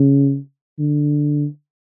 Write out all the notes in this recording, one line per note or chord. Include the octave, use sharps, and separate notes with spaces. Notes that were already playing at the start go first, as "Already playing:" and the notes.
Already playing: C#3
D3